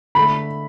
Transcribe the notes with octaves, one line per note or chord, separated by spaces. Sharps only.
D3 A3 B5